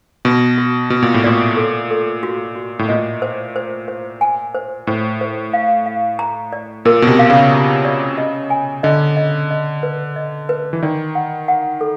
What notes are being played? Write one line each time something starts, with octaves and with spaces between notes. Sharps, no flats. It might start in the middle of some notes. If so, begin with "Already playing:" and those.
B2 F#4
F#4
B2 F#4
A#2
A2
A#2 D5
A4
A4
F#4
F#4
A2
A#2 D#5
C5
C5
C5
G#5
C5
A2 C5
C5
F5
F5
A#5
D5
A#2 A#4
B2
C3
F5
C#3
A#5
D5
D#5
G#5
D3 D#5
D#5
D#5
B4
D#5
B4
E3
D#3 D5
F#5
F#5
A4